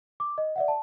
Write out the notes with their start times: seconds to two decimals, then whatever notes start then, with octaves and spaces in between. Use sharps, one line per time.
0.20 D6
0.38 D#5
0.56 D5 E5 F#5
0.68 A5